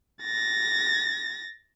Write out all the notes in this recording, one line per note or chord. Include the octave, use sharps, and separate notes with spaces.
A6 A#6